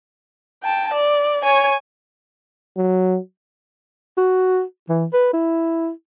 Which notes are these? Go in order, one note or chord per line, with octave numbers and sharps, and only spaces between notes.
G5 A5
D5
C#5 G#5
F#3
F#4
E3
B4
E4